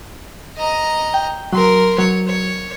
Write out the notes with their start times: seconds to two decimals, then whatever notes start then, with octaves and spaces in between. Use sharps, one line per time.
0.58 D#5 A#5
1.14 G5
1.53 F#3 A#4 C6
1.98 F#3 C#5
2.27 C#5